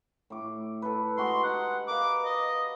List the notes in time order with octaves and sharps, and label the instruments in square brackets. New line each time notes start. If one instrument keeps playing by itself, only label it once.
[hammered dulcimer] A2 D6
A4 B4
[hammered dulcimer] G#3 F#4 D#5 [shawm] C6
[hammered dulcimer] D#4 G4 [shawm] F#5
[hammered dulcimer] A#4 B4 F5 [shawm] D6
[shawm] D#5